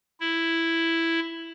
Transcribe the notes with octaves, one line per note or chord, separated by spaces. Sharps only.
E4